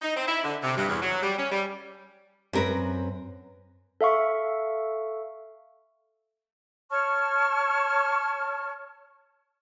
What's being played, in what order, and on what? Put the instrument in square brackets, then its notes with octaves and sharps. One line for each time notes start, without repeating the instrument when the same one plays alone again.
[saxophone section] D#4
C4
E4
D3
C3
G2
E2
F#3
G3
C#4
G3
[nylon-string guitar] F#2 C4 A#4 B4
[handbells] A4 E5 F5 C#6
[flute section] C#5 A5 C#6 F6